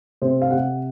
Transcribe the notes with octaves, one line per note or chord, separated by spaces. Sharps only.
C3 C5
F5
C3 F#5